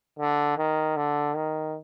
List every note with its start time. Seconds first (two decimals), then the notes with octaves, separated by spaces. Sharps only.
0.19 D3
0.57 D#3
0.97 D3
1.36 D#3